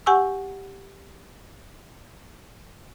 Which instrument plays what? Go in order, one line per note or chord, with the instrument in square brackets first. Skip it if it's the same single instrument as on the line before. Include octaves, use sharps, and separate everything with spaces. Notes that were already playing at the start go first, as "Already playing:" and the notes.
[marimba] G4 F#5 G#5 C#6 E6